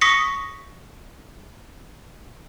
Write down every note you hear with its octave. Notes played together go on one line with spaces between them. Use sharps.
C#6 D#6 A#6 B6 C#7